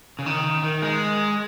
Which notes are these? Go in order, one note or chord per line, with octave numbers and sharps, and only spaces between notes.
C#3
D#3
D#3
G#3